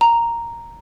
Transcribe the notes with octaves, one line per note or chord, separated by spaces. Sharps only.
A#5